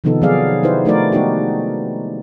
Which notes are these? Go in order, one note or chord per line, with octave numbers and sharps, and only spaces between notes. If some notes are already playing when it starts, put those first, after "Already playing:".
C3 D#3 F3 B3 D#4 A4
F3 F#3 B3 G#4 D5 F5
D#4 E4 G4 B4 C5
F3 A3 D#4 F#4 A#4 D5
G#3 B3 D#4 F#4 G4